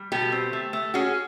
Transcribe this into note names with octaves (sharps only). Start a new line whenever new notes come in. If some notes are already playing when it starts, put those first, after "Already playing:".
Already playing: G3
B2 G4 A4
C4
A3
A3
C#4 F#4 G#4